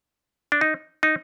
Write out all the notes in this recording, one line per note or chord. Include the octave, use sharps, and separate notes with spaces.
D4
D#4
D#4